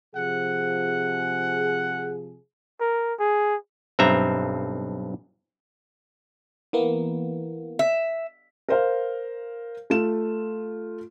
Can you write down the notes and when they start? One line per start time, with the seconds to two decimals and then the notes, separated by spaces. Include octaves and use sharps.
0.15 C3 F3 G#4 F#5
2.81 A#4
3.19 G#4
3.99 B1 G2 C4 E5 A#5
6.73 E3 A#3 B3
7.79 E5
8.69 A#4 C5 F5
9.90 A3 F4 E7